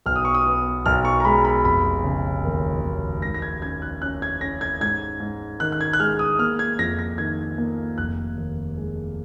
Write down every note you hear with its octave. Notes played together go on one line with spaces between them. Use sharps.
B1 F6
D#6
C#6
D#6
B3
B1 F6
C#6
A#5
G#3 B5
B5
F1 B5
C#3
D#2
D#2
G#2 A#6
A#6
G#6
C#4 G#6
F#6
C#4 F#6
G#6
C#4 A#6
G#6
G#2 G#6
G#2
D#3 F#6
F#6
G#6
F#6
G#3 F6
D#6
A#3 F6
G#6
F2 A#6
A#6
D#3 G#6
A#3
F1 F#6
D#2
G#3